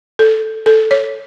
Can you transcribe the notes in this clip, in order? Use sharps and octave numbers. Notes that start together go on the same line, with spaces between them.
A4
A4
C#5